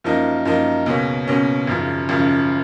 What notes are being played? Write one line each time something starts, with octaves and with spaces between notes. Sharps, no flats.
F#2 F3 A#3 D#4
F#2 F3 A#3 D#4
C#2 B2 A#3 C#4
C#2 B2 A#3 C#4
G#1 F#2 C#3 F3
G#1 F#2 C#3 F3